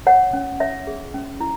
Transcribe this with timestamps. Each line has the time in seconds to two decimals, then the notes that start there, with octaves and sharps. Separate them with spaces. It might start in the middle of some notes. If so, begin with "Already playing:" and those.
0.07 C#5 F#5
0.33 C#4
0.60 C#5 E5
0.87 G#4
1.14 C#4
1.41 E4